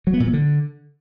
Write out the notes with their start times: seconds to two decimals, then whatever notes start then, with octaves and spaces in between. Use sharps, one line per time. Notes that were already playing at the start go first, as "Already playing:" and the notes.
0.07 F#3
0.13 B3
0.20 A#2
0.27 F3
0.33 D3